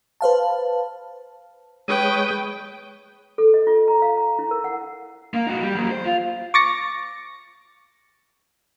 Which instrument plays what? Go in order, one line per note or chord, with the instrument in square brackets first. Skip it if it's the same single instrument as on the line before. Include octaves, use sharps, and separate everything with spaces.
[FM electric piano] B4 C5 F5 A5
[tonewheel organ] G#3 C#5 D#6 [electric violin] B4 G5
[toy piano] A4
D#5
F4
A#5
F5
A#5
E4
A#4
F#5
[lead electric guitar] A#3
D#4 F#4
G3
F#3 A#3
C5
F4
[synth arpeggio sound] C#6 D6 A6 A#6 C#7